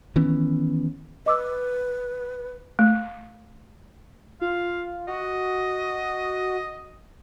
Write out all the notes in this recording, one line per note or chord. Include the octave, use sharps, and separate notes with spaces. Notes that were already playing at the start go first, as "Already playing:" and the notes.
D#3 E3 B3 C#4
B4 D#5 D6 E6
A3
F4 F5
F#4 D#5